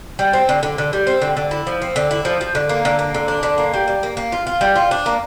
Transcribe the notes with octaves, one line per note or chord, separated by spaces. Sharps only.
G3
C4
D3
D3
D3
G3
C4
D3
D3
E4
F3
C4
D3
E4
F3
F3
D3
A#3
D3
A#3
D3
D4
D3
A#3
G3
G3
A#3
A#3
F4
F4
G3
F4
D4
A#3